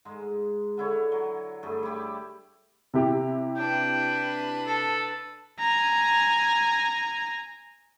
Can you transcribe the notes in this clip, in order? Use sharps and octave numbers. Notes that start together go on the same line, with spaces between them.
G#2 G#3
D3 E4 C#5
F#3
G2 A3 G#4
E4 G4
C3 E4 G4
D4 B4 G5
A4
G#5 A#5